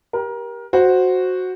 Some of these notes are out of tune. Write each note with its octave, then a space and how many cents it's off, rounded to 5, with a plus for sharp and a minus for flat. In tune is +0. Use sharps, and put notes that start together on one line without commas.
G4 +0 A#4 +25
F#4 -5 C5 +0